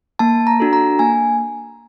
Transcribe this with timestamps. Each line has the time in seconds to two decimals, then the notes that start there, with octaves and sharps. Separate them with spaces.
0.19 A#3 A5
0.47 A#5
0.60 D4 F#4 A4
0.73 A#5
0.99 A#3 G#5